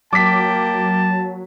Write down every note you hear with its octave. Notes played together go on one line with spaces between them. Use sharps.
F#3 A#3 G5 A5 D6 B6